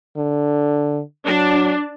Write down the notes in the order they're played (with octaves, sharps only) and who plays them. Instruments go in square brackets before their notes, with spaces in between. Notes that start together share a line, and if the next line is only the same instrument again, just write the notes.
[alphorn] D3
[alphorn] F#3 [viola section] D4